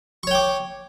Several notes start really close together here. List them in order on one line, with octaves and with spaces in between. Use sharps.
C#6 C#5 G5 D6